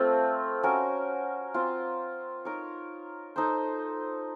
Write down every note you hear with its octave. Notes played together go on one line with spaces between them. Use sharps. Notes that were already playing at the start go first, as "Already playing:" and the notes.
Already playing: A3 C4 F4 A4
C#4 F#4 A#4
C4 F4 C5
D#4 A#4 C#5
D#4 A4 C5